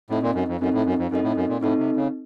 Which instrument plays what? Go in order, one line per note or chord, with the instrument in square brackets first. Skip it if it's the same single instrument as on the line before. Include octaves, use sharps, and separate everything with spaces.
[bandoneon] A2 [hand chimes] C4 D#4 A4 D#5
[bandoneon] A#2
F#2
F2
[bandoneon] F#2 [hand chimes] C4 D#4 A4 D#5
[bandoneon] A2
F#2
F2
[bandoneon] F#2 [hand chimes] C4 D#4 A4 D#5
[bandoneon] A2
F#2
A#2
[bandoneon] A2 [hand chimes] C4 D#4 A4 D#5
[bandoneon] C3
C#3